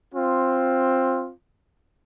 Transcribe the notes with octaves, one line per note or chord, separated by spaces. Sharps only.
C4 F4